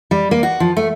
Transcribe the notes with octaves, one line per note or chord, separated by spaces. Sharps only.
G3
A#3
F#4
F3
A3